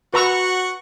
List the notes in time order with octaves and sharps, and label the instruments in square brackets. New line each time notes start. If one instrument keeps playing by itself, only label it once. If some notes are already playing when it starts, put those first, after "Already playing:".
[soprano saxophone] F#4 [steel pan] B4 A#5 E6 [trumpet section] F#5 C#6